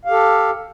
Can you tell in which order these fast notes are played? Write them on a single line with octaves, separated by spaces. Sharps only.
F5 G4 A4